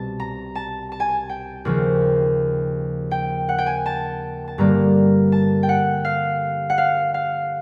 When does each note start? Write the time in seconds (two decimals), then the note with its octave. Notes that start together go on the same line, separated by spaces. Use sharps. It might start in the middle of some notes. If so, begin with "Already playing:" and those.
Already playing: C2 B2 A5
0.20 A#5
0.55 A5
0.92 A5
1.00 G#5
1.09 A5
1.29 G5
1.65 D#2 C#3 F3
3.11 G5
3.49 F#5
3.58 G5
3.66 G#5
3.86 A5
4.48 A5
4.58 G2 D3 G3 A#3 A#5
5.32 A5
5.63 G5
5.69 F#5
6.05 F5
6.70 F#5
6.78 F5
7.14 F5